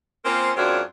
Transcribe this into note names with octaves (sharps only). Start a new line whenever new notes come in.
A#3 C4 C#4 F4 A#4 C5
F#2 G#3 C4 D4 F4 F#4